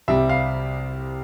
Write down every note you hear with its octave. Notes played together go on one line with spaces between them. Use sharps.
C2 C3 G3 E5
F5